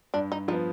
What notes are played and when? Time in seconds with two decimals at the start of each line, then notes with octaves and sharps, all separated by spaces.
0.14 G2 D4
0.32 D#4
0.48 F3 D#4
0.51 B3